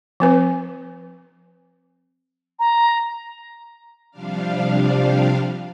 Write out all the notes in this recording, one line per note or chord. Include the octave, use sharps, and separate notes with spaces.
F3 C4 B4
A#5
C3 F3 G3 D4 F5